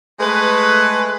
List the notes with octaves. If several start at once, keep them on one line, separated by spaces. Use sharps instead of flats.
G#3 A3 B4